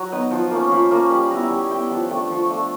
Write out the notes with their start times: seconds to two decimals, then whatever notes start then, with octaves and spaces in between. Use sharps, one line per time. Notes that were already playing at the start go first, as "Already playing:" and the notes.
Already playing: F#3
0.12 B3 D#4
0.31 F3
0.51 A#3 C#4
0.70 F3 B5
0.91 A#3 C#4
1.10 G3 B5
1.30 B3 E4 A#5
1.50 G3 G#5
1.70 B3 E4 G5
1.90 F3 F#5
2.10 A3 D4 G5
2.30 F3 C#6
2.50 A3 D4